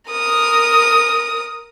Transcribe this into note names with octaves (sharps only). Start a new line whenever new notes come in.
A#4 D#6